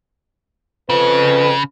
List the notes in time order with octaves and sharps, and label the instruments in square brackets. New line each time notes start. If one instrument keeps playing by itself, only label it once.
[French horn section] F2 B4 [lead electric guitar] C#3